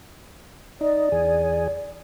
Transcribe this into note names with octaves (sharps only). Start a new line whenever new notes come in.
D#4 D5
E2 G#4